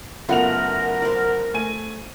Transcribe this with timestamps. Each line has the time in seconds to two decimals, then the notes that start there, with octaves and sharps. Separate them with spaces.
0.29 F#1 A3 B3 F4 A#4 F#5 F7
1.02 C5 D5
1.54 A3 G#5 D#7